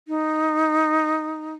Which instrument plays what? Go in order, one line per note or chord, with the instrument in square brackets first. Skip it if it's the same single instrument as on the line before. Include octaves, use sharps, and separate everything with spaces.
[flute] D#4